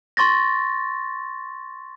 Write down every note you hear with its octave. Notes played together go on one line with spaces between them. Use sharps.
C6 C#6 A6 A#6